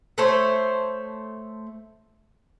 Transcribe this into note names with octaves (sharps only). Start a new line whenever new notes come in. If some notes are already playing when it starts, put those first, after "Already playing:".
A3 A4 C5 C#5